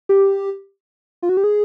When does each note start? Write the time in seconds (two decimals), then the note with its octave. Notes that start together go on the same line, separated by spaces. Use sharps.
0.09 G4
1.23 F4
1.29 F#4
1.37 G4
1.44 G#4